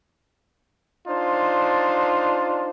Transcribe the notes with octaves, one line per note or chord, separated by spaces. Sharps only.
D4 D#4 F4 C5